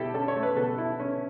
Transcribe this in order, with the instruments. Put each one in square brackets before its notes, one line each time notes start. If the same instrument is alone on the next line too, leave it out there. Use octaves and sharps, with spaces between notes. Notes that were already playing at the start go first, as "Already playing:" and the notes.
Already playing: [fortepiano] B2 E4 G4 A4
C#4 A4
C#5
A3
B4
B2 A4
E4
C#4